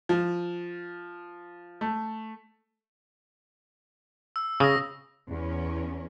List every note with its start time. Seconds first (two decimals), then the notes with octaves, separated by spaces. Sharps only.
0.09 F3
1.81 A3
4.36 E6
4.60 C#3 D#6 E6 A#6
5.29 E2 C#4